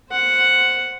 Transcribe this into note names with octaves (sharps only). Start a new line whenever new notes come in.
C5 F#5